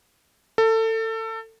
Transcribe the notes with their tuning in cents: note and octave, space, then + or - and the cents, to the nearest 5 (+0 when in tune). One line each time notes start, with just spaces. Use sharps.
A4 +25